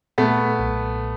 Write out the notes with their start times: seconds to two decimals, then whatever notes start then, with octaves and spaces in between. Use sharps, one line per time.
0.18 A#2 A3 B3
0.59 B1